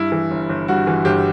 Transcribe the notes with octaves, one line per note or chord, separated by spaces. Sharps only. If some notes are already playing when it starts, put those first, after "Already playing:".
Already playing: G2 E4
E3
G1
G1
G2 F#4
E3
G1 G4